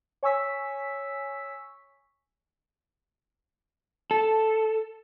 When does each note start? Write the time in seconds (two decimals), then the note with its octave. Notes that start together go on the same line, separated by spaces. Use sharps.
0.23 C#5 G#5 C#6 E6 B6
4.11 A4